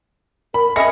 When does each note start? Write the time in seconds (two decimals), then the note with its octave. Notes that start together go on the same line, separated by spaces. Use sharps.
0.54 A#4 B5
0.76 A3 C#4 G#4 D#5 E5 B5 A#6 C#7